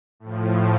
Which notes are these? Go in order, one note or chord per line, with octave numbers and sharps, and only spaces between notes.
A2 F3